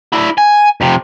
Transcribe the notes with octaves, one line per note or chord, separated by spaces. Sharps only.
D4 E4
G#5
F2 C3